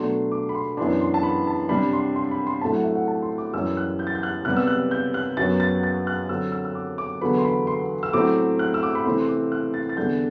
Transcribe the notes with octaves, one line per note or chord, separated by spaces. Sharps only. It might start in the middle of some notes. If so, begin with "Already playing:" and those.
Already playing: B2 F#3 A3 D4 C6
D6
B5
C6
F#2 E3 B3 D4 C6
C6
A5
B5
A5
C3 G3 D4 B5
C6
C6
B5
C6
A2 F#3 A3 C4 A5
F#5
E5
F#5
A5
C6
D6
F#2 E3 G3 E6
F#6
G6
A6
G6
F#6
C3 G3 B3 F#6
E6
F#6
G6
F#6
F#2 F#3 B3 A6
A6
A6
F#6
D3 F#3 C4 E6
E6
E6
D6
D6
E2 D3 F#3 B3 B5
C6
B5
C6
E6
A2 F#3 A3 C4 D6
F#6
E6
D6
B5
C3 E3 A3 C4 C6
C6
D6
F#6
A6
A6
E2 D3 G3 D4 G6